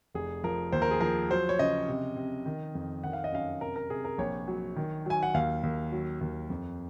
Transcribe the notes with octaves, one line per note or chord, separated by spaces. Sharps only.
F1 G#4
F3 A#4
D#2 C5
A#4
G#4
F3 A#4
F#3 C5
C#5
C#3 D#5
C3
C3
D#3
F2
D#3 F#5
F5
D#5
F#2 F5
C3 A#4
A#4
C3 G#4
A#4
A#1 C#5
F#3
D#3
F#3 G#5
F#5
D#2 F5
D#2
F#3
D#2
F2